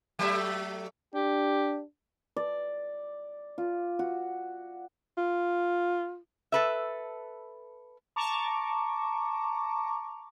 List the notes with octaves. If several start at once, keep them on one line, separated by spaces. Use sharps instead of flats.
F#3 A3 E5
D4 G4
D5
F4
F#4
F4
A4 B4 E5
A5 A#5 C#6 D6